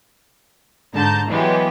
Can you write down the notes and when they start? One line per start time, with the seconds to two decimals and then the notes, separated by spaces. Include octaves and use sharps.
0.93 G#2 D3 A5 A#5 G6
1.30 E3 F#3 G#3 B3 G4